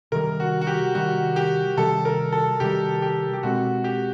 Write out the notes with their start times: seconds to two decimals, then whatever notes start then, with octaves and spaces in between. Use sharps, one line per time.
0.12 C3 D#3 G3 A#4
0.40 F#4
0.61 F#4
0.67 G4
0.95 C3 D#3 G3 F#4
1.36 G4
1.77 C3 D#3 G3 A4
2.05 A#4
2.33 A4
2.60 C3 D#3 G3 G4
3.02 G4
3.33 G4
3.43 B2 G#3 C4 F#4
3.84 G4